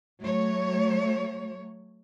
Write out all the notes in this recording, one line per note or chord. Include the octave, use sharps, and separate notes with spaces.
F#3 A3 C#5